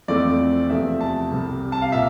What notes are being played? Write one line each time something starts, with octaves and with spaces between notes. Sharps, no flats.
F2 E3 A3 C4 D5
E2 C3 F3 A3 E5
A5
C2 C3 G3
A5
F5
A#2 E5